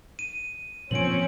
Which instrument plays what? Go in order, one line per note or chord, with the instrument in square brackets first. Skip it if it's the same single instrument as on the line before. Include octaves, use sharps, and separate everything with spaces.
[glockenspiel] D#7
[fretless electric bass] A#2 F3 [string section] C4 C#4 [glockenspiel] D7 F#7